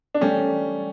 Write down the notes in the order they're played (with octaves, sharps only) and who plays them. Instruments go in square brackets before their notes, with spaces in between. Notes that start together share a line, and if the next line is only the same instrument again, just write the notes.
[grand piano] D4
[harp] G3 [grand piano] A3 C#4